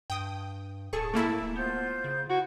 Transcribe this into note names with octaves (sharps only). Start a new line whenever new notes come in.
G2 G5 D#6
D1 G#4 A4 G#5 A5 C#6
A3 A#3 E4
B3 F4 C5 G6
C#3
E4 F#4